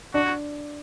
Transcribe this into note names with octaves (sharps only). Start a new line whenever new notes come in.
D4 F#4